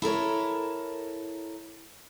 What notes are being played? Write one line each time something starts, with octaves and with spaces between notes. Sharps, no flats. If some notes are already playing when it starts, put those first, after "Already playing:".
E4 A4 A#4 C#5